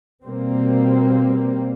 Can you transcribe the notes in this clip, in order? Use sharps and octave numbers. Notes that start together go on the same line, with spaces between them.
B2 G3 A#3 C4